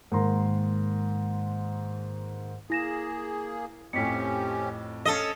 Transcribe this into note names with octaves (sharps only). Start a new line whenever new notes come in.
G#2 D#3 A#3 A#5 C6
A#3 E4 G#4 A#6 E7
F2 A2 F3 C#4 G4 B6 C#7
C#4 A4 D#5 F5